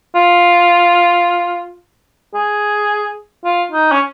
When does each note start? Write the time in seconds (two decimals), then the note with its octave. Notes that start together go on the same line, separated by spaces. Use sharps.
0.15 F4
2.34 G#4
3.44 F4
3.72 D#4
3.91 C#4